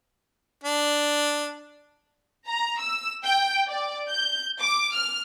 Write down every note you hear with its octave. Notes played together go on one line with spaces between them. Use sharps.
D4
A#5
E6
G5
D5
G6
D6
F6